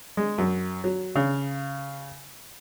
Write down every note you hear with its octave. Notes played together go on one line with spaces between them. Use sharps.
G#3
F#2
F#3
C#3